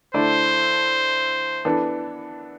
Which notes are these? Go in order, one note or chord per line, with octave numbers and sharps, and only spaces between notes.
D3 A3 E4 A4 C5 D5
E3 B3 D4 A4